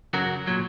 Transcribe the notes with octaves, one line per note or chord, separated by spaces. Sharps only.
F#2 C#3 F#3 F#4 A#4
A#2 F#3